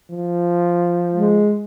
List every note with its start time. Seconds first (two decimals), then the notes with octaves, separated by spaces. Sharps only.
0.10 F3
1.14 G#3